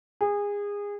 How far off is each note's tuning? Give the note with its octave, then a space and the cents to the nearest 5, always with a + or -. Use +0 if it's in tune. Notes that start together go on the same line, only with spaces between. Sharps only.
G#4 -25